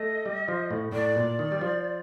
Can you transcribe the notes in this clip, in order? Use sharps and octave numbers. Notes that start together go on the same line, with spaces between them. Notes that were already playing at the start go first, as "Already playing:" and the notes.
Already playing: A3 D#5
G3
F3
A2
A2 D5
A#2
D#3
G3
F3